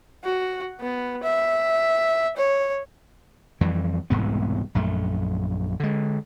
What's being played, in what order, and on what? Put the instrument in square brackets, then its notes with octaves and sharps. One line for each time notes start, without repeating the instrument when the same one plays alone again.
[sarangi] F#4
B3
E5
C#5
[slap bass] F2 E3 G3
E1 C2 G#2 B3
A#1 F#2 A3
D3 G#3